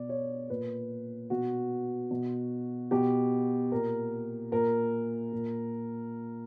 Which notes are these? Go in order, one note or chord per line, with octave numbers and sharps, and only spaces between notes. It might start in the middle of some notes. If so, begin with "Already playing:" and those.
Already playing: B2 D5
C#5
A#2 B4
B2 F#4
B2
B2 G4
A#2 A#4
A#2 A#4
A#2